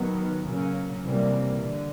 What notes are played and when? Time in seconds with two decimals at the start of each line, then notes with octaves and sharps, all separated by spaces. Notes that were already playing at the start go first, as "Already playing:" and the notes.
Already playing: D#3 F#3 B3
0.44 C#3 F#3 A#3 C#4
1.03 C3 E3 G3 A#3
1.62 D3